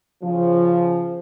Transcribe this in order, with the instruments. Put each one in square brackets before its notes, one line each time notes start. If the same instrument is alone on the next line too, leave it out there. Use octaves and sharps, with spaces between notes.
[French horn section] C#3 F3